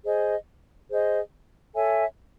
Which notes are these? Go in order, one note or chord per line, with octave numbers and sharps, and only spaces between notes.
G#4 C5 D#5
G#4 C5 D#5
A4 C#5 E5 G#5